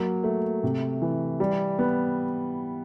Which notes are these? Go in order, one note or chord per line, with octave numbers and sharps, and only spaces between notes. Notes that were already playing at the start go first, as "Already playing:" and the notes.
Already playing: F#3 A#3
A3
C3
E3
G3
B3